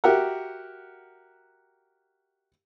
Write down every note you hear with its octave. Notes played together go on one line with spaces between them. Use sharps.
F#4 G4 A#4 E5 F#5